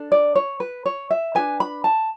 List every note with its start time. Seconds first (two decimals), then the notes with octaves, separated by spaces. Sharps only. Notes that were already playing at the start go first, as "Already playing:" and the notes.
Already playing: D4 A4
0.12 D5
0.36 C#5
0.60 B4
0.86 C#5
1.11 E5
1.35 D4 G#4 B4 G#5
1.60 B5
1.84 A5